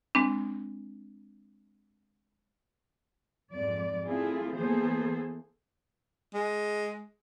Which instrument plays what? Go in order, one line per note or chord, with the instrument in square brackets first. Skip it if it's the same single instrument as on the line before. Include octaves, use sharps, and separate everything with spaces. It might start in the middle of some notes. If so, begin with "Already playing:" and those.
[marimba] G#3 C4 D4
[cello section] F2 G#2 D5
A3 C4 E4 F4 G#4 A4
E3 A#3 B3 G#4 A4 C5
[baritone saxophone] G#3